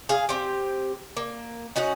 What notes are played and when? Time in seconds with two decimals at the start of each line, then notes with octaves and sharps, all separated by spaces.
0.09 G#4 F5
0.29 C4 G4
1.17 A#3
1.76 C#4 D#4 F#4 F#5